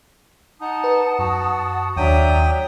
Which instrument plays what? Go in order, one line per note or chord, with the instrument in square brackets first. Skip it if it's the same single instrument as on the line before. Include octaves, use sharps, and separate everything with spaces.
[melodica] D#4 [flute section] F#5 A5 D#6
[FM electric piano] B4
[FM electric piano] F#2 [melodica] F#4
[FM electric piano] D#2 [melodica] F#3 G5 D#6 [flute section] D4 E5 A#5